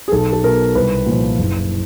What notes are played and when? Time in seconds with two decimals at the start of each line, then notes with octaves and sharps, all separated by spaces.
0.08 G#4
0.12 B1 A4
0.33 A4
0.44 B2 A#4
0.75 C2 B4
1.06 A#2 F3
1.38 F#1